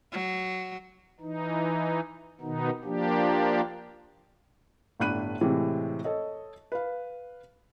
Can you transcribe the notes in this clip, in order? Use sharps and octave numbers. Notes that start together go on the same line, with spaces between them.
F#3
E3 D#4
B2 D#3 B3 D#4
F3 A#3 D4 G4
G1 A2 D4 B5 F#6 D#7
A2 C3 E3 G#3 C4
A4 C#5 D#5
B4 F5